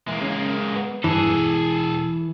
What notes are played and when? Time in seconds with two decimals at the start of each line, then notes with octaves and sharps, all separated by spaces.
0.08 E3 G#3 A#3
0.21 C#3
0.76 B3
1.04 G2 E3 G#4 A4
1.24 E1